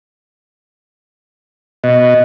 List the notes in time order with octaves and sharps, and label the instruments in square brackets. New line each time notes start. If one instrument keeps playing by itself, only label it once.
[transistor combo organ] B2 [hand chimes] D#5